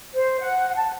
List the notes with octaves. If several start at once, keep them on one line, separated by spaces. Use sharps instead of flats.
C5
F#5
A5